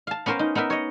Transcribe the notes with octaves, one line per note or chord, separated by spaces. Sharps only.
F5 A5
B3 C#4 A#4 C5 F5
D#4
B3 D#4 A#4 E5
C#5 D#5